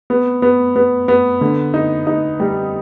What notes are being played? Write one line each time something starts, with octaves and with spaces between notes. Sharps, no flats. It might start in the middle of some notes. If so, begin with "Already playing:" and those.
B3
B3
B3
B3
D3
D#4
D#4
G3